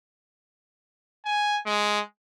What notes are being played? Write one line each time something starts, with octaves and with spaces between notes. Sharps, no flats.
G#5
G#3